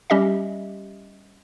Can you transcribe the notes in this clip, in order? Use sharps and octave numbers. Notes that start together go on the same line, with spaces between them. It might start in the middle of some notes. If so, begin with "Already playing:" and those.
G3 C#4 G4 D#5 E5